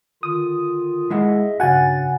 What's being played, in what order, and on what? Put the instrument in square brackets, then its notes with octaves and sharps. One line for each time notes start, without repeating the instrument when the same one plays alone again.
[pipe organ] D3 D#3 F4 [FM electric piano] D#6
[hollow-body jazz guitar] G#3 E4 F#5 [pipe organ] G#4 D#5 E5
[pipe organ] G2 A6 [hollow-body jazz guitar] C#3 F#4 [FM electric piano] F#5 G#5